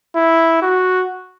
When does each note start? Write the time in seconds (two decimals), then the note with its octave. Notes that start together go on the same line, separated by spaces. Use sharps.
0.16 E4
0.62 F#4